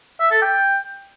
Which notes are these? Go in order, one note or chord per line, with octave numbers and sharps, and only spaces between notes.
E5
A4
G5